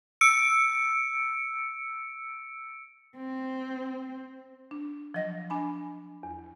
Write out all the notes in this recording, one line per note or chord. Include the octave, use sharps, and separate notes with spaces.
E6 C#7 D7
C4
D4
F3 F#3 D#5 A#6
D4 G#5 B5
E2